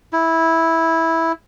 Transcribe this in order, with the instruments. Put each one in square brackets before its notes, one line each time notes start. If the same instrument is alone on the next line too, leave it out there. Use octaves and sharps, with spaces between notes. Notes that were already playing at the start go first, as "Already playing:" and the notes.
[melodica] E4